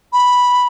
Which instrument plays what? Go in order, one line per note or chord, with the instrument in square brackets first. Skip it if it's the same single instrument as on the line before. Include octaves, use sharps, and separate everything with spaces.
[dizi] B5